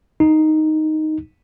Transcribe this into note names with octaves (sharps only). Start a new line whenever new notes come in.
D#4